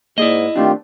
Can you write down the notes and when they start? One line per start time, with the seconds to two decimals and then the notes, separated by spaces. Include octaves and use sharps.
0.18 G#2 A#3 E4 G#4 D5 D#5
0.56 D#3 A3 C4 D4 F4 G4